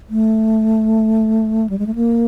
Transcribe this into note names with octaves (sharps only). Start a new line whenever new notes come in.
A3
G3
G#3
A3
A#3